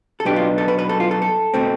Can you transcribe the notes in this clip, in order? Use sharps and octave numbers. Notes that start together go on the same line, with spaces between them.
A4
B1 B2 B3 D4 G4
F4
A4
B4
B4
A4
F4
A4
A4
B2 A3 C4